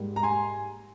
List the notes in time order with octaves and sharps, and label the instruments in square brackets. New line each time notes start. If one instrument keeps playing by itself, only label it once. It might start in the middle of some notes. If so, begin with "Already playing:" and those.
Already playing: [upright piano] G#2 G3 A#3
A#5
G#5 C6